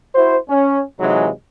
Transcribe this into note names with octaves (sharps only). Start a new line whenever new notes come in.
E4 F#4 C5
C#4
C3 E3 F#3 G#3 D#4